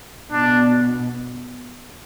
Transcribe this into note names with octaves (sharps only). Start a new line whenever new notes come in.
B2 D4